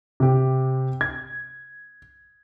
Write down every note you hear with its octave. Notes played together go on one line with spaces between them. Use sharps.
C3 G4
G#6